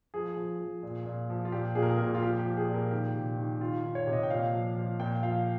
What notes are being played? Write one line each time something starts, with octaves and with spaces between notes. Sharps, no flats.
F3 G#4
F3
F3
A#2
A#2
F3
F4
A#2 G4
A#2 G#4
A#4
G#4
A#2 A#4
F4
F3 G4
G4
F3
G#4
A#2
A#4
D#3 G4
C3
D#3
D#3 F4
D#3
C#5
C3
D#5
G5
A#2 F5
F3
F3
A#2 G5
F3 F5